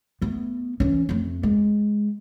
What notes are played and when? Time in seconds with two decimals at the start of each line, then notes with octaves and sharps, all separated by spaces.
0.21 A3 B3
0.80 E3 C#4
1.09 F2 A3
1.43 G#3